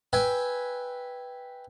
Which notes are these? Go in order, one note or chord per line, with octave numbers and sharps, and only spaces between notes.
B4 E5 G5 G#5